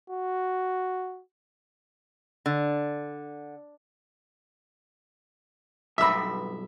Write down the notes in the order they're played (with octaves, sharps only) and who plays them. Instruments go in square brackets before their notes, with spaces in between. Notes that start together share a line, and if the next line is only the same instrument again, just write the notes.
[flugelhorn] F#4
[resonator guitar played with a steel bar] D3
[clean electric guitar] B1 G2 B5 [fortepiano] E5 E6